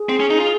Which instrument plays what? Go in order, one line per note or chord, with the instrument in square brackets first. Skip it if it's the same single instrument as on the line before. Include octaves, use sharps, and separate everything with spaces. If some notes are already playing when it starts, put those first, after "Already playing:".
Already playing: [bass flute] G#4
[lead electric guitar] C4
C#4
D#4
F4